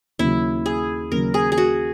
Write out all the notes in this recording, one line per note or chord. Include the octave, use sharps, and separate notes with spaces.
D#2 C#3 F#3 E4
G#4
D#2 C#3 F#3 A#4
G#4
G#4
F#4